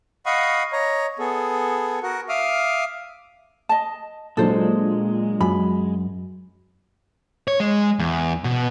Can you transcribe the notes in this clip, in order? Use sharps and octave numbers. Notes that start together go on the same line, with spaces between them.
D#5 F5 F#5 B5 C#6 D#6
C#5 D#5 A#5
B3 G#4 A4
F#4 A#4 F#5
E5 F5 D6 D#6 F6
D#5 A5
A#2 F#3 G#3 D4 A4 C5
F#2 B5
C#5
G#3
E2
B2